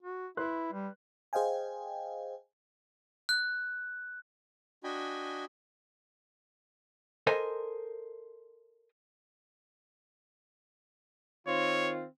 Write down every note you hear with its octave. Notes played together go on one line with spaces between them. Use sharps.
F#4
E4 B4 C6 F#6
G3
G#4 C5 D#5 F5 G5 G#5
F#6
D4 F#4 D#5 G5 G#5 B5
A4 A#4 C5 D#5 G#5
D#3 C4 F4 C#5